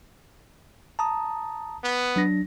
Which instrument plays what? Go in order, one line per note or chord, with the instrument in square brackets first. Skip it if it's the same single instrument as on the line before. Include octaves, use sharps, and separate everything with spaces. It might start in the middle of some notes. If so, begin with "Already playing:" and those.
[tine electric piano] A5 A#5 D#6
[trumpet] B3
[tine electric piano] F#3 D4 A#6